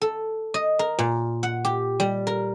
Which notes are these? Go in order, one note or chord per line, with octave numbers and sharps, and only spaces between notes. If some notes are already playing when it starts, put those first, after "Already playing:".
A4
D#5
A#4
A#2
F#5
G4
G3
A#4